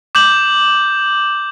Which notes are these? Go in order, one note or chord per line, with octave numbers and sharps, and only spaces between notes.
D6 G6 F#7